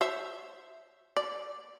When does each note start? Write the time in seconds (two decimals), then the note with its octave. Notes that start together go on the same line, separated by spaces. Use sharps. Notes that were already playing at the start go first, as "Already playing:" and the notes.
0.01 C5 C#5 E5
1.17 D5